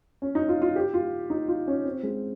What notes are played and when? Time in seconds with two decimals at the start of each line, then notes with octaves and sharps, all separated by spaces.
0.22 C#4
0.35 D#4
0.49 F4
0.62 F4
0.76 G4
0.94 F4
1.30 D#4
1.48 F4
1.67 C#4
1.85 C4
2.03 G#3